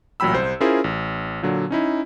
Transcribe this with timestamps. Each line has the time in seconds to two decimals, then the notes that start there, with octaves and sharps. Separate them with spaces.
0.20 A1 A#2 F#3 G5 B5 E6
0.34 C2 C5
0.60 C#4 E4 F4 G#4 A#4 C5
0.84 A1
1.43 A#2 D3 F#3
1.71 C#4 D#4 E4